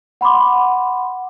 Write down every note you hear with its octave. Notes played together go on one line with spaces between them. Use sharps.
F#5 B5 C6 D6